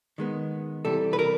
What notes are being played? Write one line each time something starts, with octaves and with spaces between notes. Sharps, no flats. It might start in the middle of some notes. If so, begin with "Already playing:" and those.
D#3 G#3 B3
C3 E3 G3 A4
B4
A#4